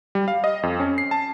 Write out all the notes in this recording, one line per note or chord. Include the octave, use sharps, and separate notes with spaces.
G3
F5
D#5
F2
C#4
C7
A5